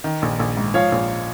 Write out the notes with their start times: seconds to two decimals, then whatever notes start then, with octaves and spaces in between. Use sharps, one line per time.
0.04 D#3
0.22 A#1
0.39 A#1
0.57 G#2
0.74 F3 C#5 F5
0.92 A#1